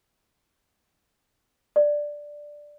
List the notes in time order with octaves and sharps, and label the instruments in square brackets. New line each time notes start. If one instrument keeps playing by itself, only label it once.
[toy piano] D5